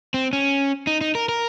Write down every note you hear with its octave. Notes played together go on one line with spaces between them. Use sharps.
C4
C#4
D#4
D#4
A#4
A#4